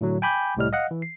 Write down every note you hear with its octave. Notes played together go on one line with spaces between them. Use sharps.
A2 D3 F#3
G5 G#5 B5 D6 G6
C2 A2 G3 D#5 F6
D#5 F5 F#5 F#6
E3
C7